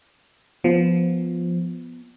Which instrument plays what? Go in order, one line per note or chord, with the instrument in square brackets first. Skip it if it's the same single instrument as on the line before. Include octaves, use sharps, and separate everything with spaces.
[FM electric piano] F3 [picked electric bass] B3